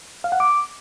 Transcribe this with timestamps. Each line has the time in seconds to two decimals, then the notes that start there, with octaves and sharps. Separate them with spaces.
0.24 F5
0.32 F#5
0.40 D6